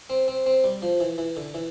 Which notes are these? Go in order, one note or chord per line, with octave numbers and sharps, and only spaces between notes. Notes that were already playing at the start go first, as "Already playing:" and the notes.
C4
C4
C4
G3
F3
E3
E3
D3
E3